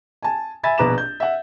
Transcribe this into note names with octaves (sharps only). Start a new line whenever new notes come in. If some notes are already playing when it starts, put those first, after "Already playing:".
G#5 A5
E5 G#5 B5 A6
A#1 B2 B4 A#5 D6 E7
G6
E5 F#5